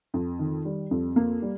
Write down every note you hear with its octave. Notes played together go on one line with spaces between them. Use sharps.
F2
D#3
G3
F2
A#3
G3